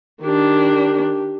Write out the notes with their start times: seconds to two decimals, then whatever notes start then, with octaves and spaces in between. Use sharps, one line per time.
0.23 D#3 D4 G4